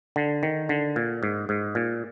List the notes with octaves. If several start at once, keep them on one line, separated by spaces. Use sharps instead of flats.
D3
D#3
D3
A#2
G#2
G#2
A#2